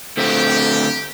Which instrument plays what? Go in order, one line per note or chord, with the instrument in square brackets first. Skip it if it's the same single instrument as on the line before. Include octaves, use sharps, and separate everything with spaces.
[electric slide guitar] D3 A3 C4 [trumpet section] G4